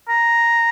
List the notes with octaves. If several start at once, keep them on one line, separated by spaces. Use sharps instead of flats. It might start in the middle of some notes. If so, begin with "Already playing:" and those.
A#5